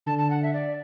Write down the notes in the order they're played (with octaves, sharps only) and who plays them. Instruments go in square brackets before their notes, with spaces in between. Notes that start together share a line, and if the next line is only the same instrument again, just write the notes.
[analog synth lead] D3 [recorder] A5
[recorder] A5
F#5
E5
D5